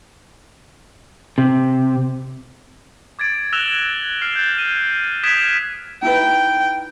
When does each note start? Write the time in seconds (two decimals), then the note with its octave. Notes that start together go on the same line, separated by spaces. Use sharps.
1.38 C3
3.19 D6 G#6 A6 D7
3.53 E6 F#6 A#6 E7 F7 G7
4.22 F6 C7
4.36 G6 A6
4.58 D#7
5.23 D#6 F#6 G#6 B6 D7 E7
6.02 D#4 E4 B4 G5